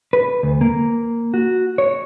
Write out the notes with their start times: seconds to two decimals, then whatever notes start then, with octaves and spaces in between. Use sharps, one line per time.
0.13 B4
0.43 D2
0.61 A#3
1.34 F#4
1.78 C#5